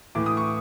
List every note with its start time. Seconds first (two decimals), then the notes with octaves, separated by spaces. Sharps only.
0.15 A2 E3 A3 D6
0.26 D#6
0.37 C#6